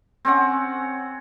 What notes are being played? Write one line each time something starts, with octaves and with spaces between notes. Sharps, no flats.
C4 C#4 F#5